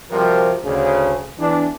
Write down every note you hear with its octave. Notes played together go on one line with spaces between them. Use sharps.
C3 F3 G3 F#4 A#4
D2 C#3
E2 E3 D4